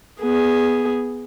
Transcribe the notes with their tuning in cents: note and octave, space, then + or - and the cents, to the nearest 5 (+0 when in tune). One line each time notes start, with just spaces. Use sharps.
B3 +0 G#4 +0